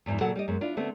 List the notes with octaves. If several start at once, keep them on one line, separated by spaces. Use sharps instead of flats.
E2 G#2 C#3 E3 F3
A#2 C#3 F#3 F#4 A4 F#5
G3 G4 D#5
F#2 G#3 B3
D4 E4 F4
D3 A3 B3 C4